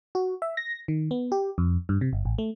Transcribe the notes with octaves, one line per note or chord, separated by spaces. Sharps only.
F#4
E5
A#6
D#3
B3
G4
F2
G2
C3
G1
A1
A3